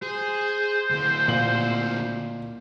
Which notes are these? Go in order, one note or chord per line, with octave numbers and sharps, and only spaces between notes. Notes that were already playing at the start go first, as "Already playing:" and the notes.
G#4 C5
D2 E4
A#2 F#7